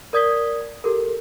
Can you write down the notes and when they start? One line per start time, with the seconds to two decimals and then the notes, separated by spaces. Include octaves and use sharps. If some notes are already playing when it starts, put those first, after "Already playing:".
0.13 A#4 D5 D#6 G#6 B6 G7
0.84 G4 A4 A#4